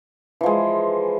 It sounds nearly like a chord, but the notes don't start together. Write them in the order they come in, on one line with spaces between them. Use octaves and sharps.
E3 F3 G#3